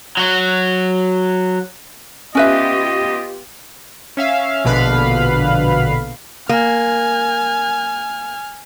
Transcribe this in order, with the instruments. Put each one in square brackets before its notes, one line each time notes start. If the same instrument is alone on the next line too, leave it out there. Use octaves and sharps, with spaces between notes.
[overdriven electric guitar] F#3 F#4
[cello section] B3 F4 G4 [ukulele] C#4 B4 E5 [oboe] D#5
[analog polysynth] C#4 E5 F5
A#1 B2 D3 B4 F5 B5
[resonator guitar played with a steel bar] A#3 [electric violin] G#5 F6